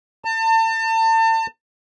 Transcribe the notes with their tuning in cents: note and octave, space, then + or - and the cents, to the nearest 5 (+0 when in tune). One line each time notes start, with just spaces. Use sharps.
A5 +35